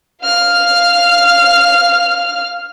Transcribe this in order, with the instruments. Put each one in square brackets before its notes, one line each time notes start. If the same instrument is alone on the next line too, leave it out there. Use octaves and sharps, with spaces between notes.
[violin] F5 F6